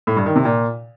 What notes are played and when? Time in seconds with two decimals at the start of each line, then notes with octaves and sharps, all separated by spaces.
0.07 A2
0.17 G2
0.26 D#3
0.36 C3
0.45 A#2